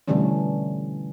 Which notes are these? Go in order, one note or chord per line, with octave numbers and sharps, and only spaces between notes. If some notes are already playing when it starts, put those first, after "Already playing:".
B2 D3 E3 G3 A3 C#4